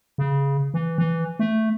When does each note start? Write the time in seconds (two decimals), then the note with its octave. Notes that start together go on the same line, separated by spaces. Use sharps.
0.18 C#3
0.74 E3
0.98 E3
1.39 A3